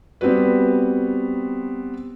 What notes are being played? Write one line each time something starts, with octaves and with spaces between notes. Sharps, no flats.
G3 B3 C4 F#4 B4